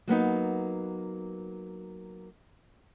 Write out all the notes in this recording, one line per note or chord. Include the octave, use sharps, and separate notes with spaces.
F#3 A#3 B3 D#4